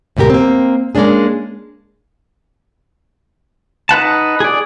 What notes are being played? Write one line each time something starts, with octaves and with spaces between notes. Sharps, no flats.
D2 G#2 B2 G4 A#4
A#3 C4
G#3 A#3 C#4 D4 G#4
D#4 B4 F#5 A5
G#4 D5